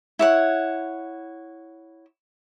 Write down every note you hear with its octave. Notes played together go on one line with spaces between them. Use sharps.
E4 C#5 F#5